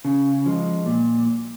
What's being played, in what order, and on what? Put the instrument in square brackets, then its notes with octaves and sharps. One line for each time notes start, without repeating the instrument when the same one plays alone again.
[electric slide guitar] C#3
F3 G#3
A#2